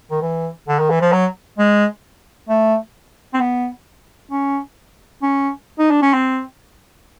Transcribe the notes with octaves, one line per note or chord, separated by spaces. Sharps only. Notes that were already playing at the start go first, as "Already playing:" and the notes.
D#3
E3
D3
D#3
E3
F3
F#3
G#3
A3
C4
B3
C#4
C#4
D#4
D4
C#4
C4